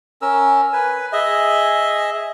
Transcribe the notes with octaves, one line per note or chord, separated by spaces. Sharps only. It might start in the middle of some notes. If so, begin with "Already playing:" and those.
C#4 A#4 E6
B4 G#5
G#4 D#5 E5